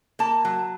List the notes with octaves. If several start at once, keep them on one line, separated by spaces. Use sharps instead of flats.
A#3 A5
F#3